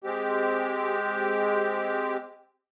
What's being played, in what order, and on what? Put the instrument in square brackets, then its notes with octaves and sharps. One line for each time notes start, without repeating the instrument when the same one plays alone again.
[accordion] G#3 C4 G4